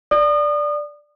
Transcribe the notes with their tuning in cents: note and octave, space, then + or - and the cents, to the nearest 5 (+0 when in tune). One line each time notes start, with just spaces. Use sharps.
D5 +0 D#6 -35